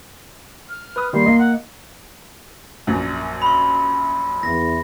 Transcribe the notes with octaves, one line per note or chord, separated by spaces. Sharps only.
F6
B4 D#6
D#3 G3 A#3 C6
A#3 D#5
F#5
A#1 F#2
B5 C6
E2 A#6